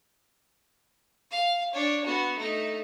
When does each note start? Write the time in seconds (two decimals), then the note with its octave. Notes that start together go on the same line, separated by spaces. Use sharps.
1.31 F5
1.74 D4 C#5
2.04 B3 F#4
2.37 A3 D#4